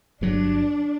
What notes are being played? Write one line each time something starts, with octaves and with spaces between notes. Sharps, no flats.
G1 G2 F#3 D4